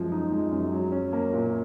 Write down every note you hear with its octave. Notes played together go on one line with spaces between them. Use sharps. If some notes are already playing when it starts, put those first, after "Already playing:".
Already playing: F#2 F3 G#3
D#4
G#3
F#2
F#3
C#4
A#3
A#2